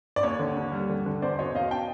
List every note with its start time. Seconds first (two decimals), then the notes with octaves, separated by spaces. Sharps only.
0.16 D5
0.23 D#2 C#5
0.39 D3
0.57 D#2
0.72 G3
0.89 D3
1.06 D3
1.22 E2 C5 D5
1.39 B2 C#5 D#5
1.55 E2 D#5 F5
1.71 G5 A5